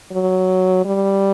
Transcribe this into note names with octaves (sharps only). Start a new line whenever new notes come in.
F#3
G3